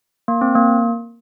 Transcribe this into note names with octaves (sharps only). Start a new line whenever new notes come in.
A#3
C4
A#3